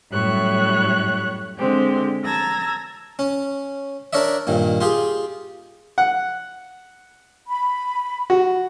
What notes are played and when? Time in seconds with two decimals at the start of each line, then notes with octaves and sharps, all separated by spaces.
0.13 F#2 A2 G3 C#5 E5 F#6
1.59 D3 G#3 C4 G4
2.24 A5 A#5 E6 G#6 A#6
3.19 C#4
4.13 D4 A#4 C#5 D5 E5
4.47 G2 A#2 D#3
4.81 F4 G4 G#4
5.98 F#5
7.48 B5
8.30 F#4